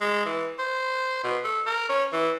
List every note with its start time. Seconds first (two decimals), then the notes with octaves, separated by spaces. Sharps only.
0.01 G#3
0.25 E3
0.59 C5
1.24 B2
1.44 A4
1.66 A#4
1.89 C#4
2.13 E3